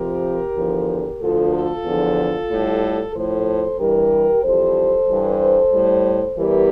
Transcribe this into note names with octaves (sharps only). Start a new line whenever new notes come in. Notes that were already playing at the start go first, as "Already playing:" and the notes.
Already playing: F2 C3 F3 G4 A#4
E2 D3 F3
D2 D3 F3 F4 A4
F4 A4
E2 D3 F3
A2 G3
A2 F3 A4 C5
G2 E3 G3 G4 A#4
F2 E3 G3 A4 C5
G2 E3 G3
A2 G3
E2 E3 G3 G4 A#4